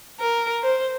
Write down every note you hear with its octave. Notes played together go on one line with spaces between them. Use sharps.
A#4
C5